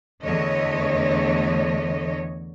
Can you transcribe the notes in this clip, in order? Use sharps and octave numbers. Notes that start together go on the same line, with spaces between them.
E2 D3 A3 C#5 D#5